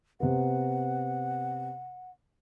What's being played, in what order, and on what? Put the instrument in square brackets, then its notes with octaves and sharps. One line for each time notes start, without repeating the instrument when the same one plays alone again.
[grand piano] C3 B3 [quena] F#5